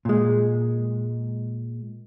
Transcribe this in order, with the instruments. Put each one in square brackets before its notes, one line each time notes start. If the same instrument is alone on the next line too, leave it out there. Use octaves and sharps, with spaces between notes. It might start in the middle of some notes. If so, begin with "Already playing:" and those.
[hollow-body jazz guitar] A#2 G#3